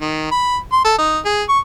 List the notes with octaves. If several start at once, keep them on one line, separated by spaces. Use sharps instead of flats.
D#3
B5
C6
A4
D#4
G#4
C#6